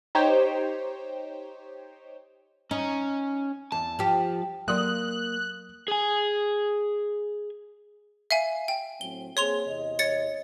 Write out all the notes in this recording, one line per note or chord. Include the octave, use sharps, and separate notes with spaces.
D#4 G4 C5 C#5 G5
C#4 D#4
E2 A5
F3 G4
F#3 A#3 D5 C6 D#6 F#6
G#4 G#5
E5 F5 G#5
G5
A2 F#3 C4 G7
A#3 C4 G#4 C#5 C6 F7
E2 C3 D#5
C#5 A6 C#7